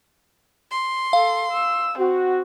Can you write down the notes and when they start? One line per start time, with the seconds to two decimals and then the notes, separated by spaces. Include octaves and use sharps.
0.71 C6
1.13 A4 F5
1.52 E6
1.99 C4 F#4